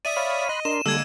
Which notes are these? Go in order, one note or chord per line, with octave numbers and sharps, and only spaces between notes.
D5 E5 D#6 D#7
C#5 F5 B5
D#5 B5 C6 F#6
D4 A#4 C6 E7
D3 G3 G#3 A#3 A4 E6 G#6